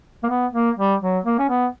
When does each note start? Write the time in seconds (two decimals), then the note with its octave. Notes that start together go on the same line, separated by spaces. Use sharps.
0.23 A#3
0.29 B3
0.54 A#3
0.78 G3
1.02 F#3
1.25 A#3
1.39 C#4
1.49 B3